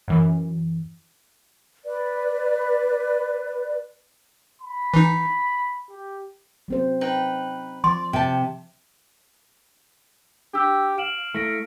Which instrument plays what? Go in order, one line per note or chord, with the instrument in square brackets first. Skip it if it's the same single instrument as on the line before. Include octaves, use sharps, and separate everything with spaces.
[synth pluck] F#2 E3
[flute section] B4 D5
[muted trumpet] B5
[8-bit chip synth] E3 D#4
[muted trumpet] G4
[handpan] F#3 C4 C5
[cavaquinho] D#4 B4 G5
[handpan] F3 [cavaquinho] D5 [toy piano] C6
[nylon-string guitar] C3 [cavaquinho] G5 A5
[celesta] D4 E6 [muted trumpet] G4
[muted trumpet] F5 [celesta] D7 E7 F#7
[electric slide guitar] A3 [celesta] E4 A#6 D7